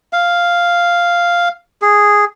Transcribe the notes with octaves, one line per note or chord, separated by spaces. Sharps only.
F5
G#4